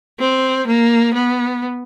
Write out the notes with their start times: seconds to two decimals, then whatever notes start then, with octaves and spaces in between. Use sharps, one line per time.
0.19 C4
0.67 A#3
1.14 B3